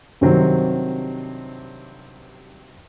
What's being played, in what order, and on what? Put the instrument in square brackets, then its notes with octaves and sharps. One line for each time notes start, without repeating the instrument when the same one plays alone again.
[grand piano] G2 C3 D#3 F#3 C4